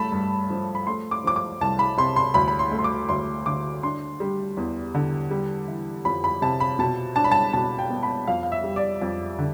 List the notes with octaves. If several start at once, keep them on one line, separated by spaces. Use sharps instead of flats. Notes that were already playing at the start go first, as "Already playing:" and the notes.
Already playing: G2 A3 A5 B5
G2
F3
B5
A3 C6
D6
F3 D6
D6
C2 A5
B5
C3 C6
C6
D2 B5
B5
C6
A3
C6
D6
D2 C6
D3 D6
D4 C6
G3
E2
D3
G3
E3
F2 B5
B5
C3 A5
B5
B2 A5
D4 A5
B5
A5
B2 A5
G5
B3
B5
F2 F5
F5
E5
G3
D5
F2
D3